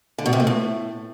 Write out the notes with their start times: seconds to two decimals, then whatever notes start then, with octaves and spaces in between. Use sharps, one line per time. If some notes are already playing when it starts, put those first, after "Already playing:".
0.18 D3
0.26 B2
0.33 C3
0.40 A3
0.47 A2